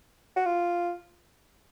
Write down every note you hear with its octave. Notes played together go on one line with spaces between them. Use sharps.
F#4
F4